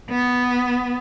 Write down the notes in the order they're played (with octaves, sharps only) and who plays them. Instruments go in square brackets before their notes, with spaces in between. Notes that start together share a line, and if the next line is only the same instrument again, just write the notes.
[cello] B3